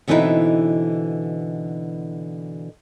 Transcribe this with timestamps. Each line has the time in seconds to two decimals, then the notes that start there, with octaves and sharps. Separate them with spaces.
0.08 B2 D3 E3 C4 D#4 E4